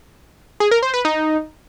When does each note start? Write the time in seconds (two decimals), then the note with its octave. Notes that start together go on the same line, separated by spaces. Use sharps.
0.60 G#4
0.71 A#4
0.83 C5
0.94 B4
1.05 D#4